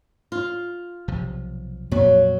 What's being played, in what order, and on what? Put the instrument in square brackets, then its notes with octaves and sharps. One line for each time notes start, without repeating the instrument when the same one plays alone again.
[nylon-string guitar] F4
[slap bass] B1 C3 F3
[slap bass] F2 A#2 B3 [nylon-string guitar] F#3